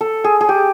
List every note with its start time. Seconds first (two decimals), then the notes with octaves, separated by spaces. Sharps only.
0.01 A4
0.24 G#4
0.41 G#4
0.49 G4